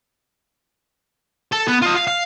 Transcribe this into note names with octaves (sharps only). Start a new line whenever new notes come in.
A4
B3
F4 D#5
F5
F5